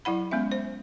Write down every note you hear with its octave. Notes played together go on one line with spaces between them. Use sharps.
F#3 E4 F#5 B5
G#3 B3 C#4 E5
C5